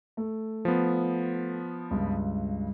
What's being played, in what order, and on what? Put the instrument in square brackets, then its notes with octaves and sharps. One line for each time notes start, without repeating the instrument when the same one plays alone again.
[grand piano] A3
[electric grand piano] F3 B3
[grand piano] C#2 G2